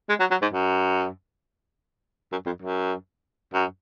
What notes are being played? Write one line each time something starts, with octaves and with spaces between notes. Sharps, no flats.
G#3
F#3
F#3
G#2
F#2
F#2
F2
F#2
F#2